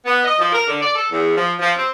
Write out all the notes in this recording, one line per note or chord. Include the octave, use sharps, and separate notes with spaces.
B3
D#5
F3
A#4
D3
D5
A4
E2
F3
F3
C4